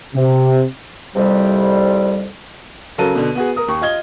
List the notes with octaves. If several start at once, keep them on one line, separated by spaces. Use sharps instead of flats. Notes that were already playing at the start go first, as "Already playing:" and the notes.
C3
C2 F2 C3 G3
C#3 F#3 A4 A#4 D#7
B2 D3
B3 F#4 G#4
A#4 D#6
D#2 C#6
F4 D#5 G#6 G7